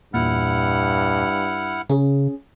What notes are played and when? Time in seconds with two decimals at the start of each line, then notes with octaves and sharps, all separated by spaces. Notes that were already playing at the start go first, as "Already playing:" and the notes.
0.14 E2 G2 A#2 E4 F#5 F6
1.90 C#3 C#4 G#4